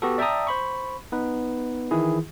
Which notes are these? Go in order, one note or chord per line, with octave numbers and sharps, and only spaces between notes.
B3 F#4 G4 A4
D5 E5 G5 A5 A#5 D#6
C5 B5 C#6
B3 D#4 B4
D#3 E3 E4 G#4